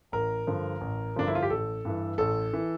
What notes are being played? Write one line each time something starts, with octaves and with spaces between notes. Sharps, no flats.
A1 A#4
G2 D3 F3
A1
G2 D3 F3 D4
E4
F4
G4
A1 A4
G2 E3
A1 A4
E3